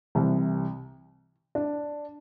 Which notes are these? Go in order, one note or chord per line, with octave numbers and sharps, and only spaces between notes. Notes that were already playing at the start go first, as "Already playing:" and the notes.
C2 C3 E3
D4